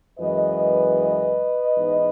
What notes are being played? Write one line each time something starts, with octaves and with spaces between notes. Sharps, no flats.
F#2 E3 G#3 B4 D#5
G#2 E3 B3 D#4